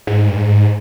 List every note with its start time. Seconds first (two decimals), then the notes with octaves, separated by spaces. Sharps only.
0.07 G#2
0.28 G2
0.36 G#2